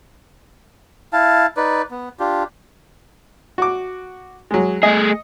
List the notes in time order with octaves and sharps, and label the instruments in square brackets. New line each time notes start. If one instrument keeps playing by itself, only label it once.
[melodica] E4 F5 A5
D#4 B4 D5
B3
D4 F4 G4
[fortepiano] F#4 D6
F#3 G#3
[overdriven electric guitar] A3 G#4 [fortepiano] D#5